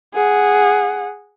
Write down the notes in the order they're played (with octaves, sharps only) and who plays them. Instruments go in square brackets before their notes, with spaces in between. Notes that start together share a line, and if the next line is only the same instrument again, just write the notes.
[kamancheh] G#4 F#5